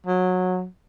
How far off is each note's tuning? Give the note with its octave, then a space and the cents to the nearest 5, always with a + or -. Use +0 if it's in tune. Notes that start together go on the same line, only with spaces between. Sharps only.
F#3 -20